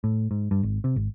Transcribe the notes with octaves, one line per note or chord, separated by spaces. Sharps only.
A2
G#2
G2
G#1
C3
G#1